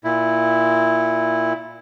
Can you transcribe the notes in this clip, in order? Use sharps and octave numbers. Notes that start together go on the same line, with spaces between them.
A#2 E4